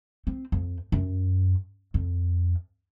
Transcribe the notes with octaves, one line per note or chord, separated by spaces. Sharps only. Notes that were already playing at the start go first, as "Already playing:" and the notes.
C4
F2
F#2
F2